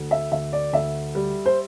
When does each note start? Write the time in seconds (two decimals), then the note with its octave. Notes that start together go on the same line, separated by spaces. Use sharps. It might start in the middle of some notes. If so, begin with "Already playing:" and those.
Already playing: D2
0.11 E5
0.32 D2 E5
0.53 D5
0.73 D2 E5
1.15 G3
1.46 C5